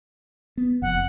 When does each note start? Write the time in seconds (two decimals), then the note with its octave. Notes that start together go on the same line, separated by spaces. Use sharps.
0.57 B3
0.82 F1 F2 F#5